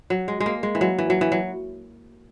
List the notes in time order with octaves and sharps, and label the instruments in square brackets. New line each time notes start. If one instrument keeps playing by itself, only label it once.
[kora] F#3
G#3
G#3
A#3
G#3
E3
F#3
E3
F#3
E3
F#3